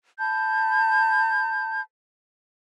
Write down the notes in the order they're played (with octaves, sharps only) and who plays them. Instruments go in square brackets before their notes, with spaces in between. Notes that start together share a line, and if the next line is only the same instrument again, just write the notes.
[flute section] A5 B5 G6